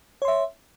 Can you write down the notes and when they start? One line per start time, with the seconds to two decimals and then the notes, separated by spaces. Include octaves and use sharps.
0.22 C#5
0.25 C6
0.28 E5